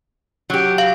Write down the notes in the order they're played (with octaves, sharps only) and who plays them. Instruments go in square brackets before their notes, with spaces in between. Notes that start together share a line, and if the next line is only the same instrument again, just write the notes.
[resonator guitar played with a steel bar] F#3 G4
[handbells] F5